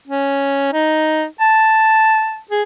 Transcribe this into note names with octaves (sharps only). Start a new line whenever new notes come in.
C#4
D#4
A5
G#4